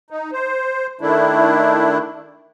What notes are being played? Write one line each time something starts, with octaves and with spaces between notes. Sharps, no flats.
D#4
C5
D#3 A3 D4 E4